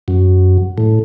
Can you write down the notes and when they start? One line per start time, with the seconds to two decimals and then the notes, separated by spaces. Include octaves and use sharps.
0.08 F#2
0.78 A2